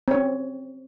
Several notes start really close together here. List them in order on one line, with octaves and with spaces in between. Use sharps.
C4 C#5 C#4